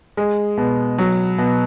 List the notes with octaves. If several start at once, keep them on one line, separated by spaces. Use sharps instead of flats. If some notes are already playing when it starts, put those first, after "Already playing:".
G#3
B2
F#3
B2